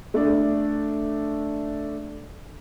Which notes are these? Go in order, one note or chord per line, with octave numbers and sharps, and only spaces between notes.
A3 D4